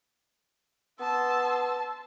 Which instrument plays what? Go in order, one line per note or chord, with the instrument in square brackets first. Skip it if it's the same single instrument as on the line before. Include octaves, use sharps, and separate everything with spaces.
[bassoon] B3 [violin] A5 [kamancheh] C6 E6